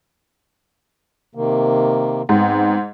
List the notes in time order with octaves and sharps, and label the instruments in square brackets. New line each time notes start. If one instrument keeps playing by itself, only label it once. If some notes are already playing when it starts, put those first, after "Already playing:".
[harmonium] C3 D#3 A#3
[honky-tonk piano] G#2 [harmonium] B3 C4